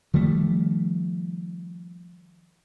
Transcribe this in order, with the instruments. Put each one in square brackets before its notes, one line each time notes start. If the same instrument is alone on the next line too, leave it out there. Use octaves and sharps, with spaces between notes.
[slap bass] D#3 F3 G3 A3